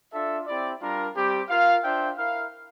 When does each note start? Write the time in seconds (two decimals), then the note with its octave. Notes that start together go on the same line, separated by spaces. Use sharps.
0.13 D4 F4 A4 E5
0.46 C4 E4 G4 D5
0.81 G3 D4 F4 A#4
1.15 G3 C4 G4
1.49 F4 A#4 F5
1.83 D4 F4 C5 E5 G5
2.17 E4 A#4 F5